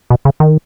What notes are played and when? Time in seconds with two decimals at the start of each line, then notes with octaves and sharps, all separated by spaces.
0.10 B2
0.25 C#3
0.40 D#3